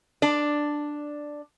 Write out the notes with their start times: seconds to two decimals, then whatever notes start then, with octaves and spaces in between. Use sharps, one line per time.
0.22 D4 D5